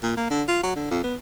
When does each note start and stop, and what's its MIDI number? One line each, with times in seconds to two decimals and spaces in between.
0.03 0.14 46
0.17 0.29 58
0.30 0.43 50
0.48 0.60 65
0.63 0.75 54
0.76 0.86 50
0.91 1.01 41
1.04 1.15 59